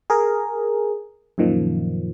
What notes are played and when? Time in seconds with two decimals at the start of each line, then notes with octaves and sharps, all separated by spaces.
0.10 G#4 A#4
1.38 F#2 A#2 D#3 F3